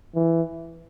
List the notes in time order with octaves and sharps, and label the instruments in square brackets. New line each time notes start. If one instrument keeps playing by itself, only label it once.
[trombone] E3